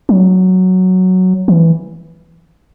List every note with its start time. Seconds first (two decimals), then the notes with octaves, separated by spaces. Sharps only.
0.09 F#3
1.48 E3